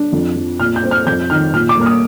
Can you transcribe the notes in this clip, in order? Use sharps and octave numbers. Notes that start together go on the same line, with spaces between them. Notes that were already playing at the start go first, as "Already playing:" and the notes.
Already playing: D4
F2
F3
A#2 F6
G6
C4
F6
F2 G6
D#3 F6
A#2 F6
D6
A#3 F6
D#6